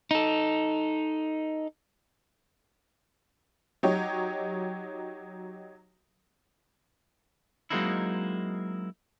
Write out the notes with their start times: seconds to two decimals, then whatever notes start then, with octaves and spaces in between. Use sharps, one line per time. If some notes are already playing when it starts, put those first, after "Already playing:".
0.11 D#4 A4
3.83 F#3 D#4 G4 C#5
7.70 F#3 G#3 A#3 C4 D#4 E4